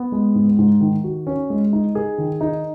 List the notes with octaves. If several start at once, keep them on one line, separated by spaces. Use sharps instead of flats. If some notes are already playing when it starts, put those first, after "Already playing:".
Already playing: B3
G#3
G#2
G#2
D#3
F#4
C#4
G#3
D#4
G#4
D#3
D#4